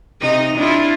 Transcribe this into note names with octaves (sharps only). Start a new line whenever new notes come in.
C3 D#4 D#5
D4 E4 F4